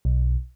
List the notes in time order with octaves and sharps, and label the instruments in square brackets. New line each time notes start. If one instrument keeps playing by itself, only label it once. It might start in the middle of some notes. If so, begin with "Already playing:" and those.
[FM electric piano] B1